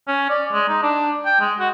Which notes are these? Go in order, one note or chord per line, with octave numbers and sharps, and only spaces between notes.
C#4
D5
G#3
D#4
D4
G5
G#3
F#4